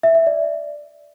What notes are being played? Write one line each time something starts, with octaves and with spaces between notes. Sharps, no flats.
E5
E5
D5